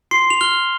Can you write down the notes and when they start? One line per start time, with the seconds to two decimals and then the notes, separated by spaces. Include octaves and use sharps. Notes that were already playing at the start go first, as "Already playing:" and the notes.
0.11 C6 C7
0.30 F7
0.41 F6 G7